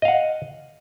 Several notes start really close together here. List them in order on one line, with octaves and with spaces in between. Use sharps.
D#5 F5 F#5